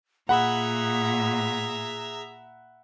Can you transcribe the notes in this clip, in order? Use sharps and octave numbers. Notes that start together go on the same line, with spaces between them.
A#2 G#4 E5 F#5 A#5 B5